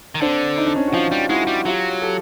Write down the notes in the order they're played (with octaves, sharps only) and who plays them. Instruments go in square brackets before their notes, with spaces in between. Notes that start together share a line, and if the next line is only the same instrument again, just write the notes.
[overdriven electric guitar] D#3
[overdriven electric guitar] D3 [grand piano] C4 D4
[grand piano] D#4
D4
C#4 D#4
F#4
[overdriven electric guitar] F3 [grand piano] D#4 F4
[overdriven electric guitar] G3
[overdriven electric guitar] G#3 [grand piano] E4 F#4
[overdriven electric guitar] G3
[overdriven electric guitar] F#3 [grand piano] F4 G4
[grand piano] G4 A4